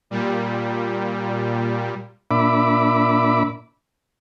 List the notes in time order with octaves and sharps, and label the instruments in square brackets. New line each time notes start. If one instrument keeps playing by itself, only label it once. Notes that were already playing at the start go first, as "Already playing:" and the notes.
[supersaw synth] A#2 G3
[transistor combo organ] A#2 D4 E5 B5 D6